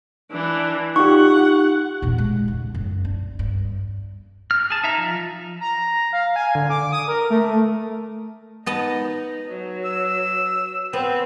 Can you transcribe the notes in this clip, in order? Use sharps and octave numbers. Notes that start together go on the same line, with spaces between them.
E3 D4
D#4 F4 G4 F#5 C#6
E2 A#2
G#3
C#3
F#2
D4
G2
F6
G#4 A5
D#4 E5 A#5
F3
A#5
F5
G#5
D3
D6
D#6
A#4
A3
B3 D#4 D#5 A5
F#3
E6
B3 C4